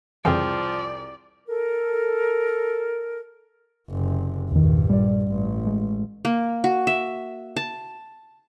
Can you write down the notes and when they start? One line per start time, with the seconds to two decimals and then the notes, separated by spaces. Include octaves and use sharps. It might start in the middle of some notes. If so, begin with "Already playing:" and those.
0.25 C2 F2 C#3 E3 F3 G#4 D5 G5
1.48 A4 A#4
3.91 F#1 C3
4.52 A#1 E2 G2 D#3
4.90 G3 D5
5.29 A1
5.67 G#3
6.25 A#3
6.64 F#4
6.87 E5
7.56 A5